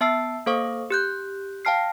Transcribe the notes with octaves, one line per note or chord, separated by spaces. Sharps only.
B3 E5 A5 E6 C7
A#3 A4 C5 F5 C#6 D#6
G4 F#6 G6
F5 G5 A5 F6 C7